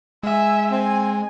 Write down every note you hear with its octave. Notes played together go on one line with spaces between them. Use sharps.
G#3 E5 G#5
C4 G#5